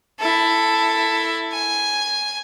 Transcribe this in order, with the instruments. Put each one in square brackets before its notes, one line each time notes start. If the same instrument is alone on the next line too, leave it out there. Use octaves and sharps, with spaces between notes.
[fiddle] E4 A4
G#5